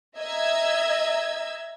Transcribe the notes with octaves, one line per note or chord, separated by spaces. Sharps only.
D#5 E5 A#5 E6 G#6